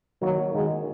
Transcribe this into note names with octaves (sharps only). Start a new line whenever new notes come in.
D#3 F#3 A#3 F#4 A#4
D#3 G#3 A#3 F#4 A#4